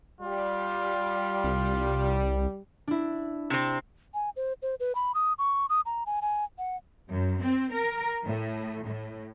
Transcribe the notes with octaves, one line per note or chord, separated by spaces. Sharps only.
G3 F4
C2
D4 E4
C3 C4
G#5
C5
C5
B4
B5
D#6
C#6
D#6
A#5
G#5
G#5
F#5
F#2
C4
A#4
A2
A2